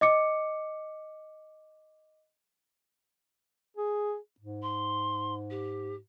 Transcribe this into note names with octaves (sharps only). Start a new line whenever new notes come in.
D#5 D6 C#7
G#4
G#2
C6
G4